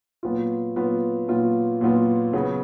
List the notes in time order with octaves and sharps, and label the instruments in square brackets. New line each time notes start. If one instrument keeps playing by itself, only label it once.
[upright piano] A#2 F#3 B3 F4
A#2 F#3 B3 F4
A#2 F#3 B3 F4
A#2 F#3 B3 F4
C#3 F#3 B3